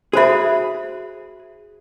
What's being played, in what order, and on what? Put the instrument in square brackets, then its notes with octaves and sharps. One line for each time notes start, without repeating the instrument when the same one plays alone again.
[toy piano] F#4 C5 E5 [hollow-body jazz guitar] G#4 B5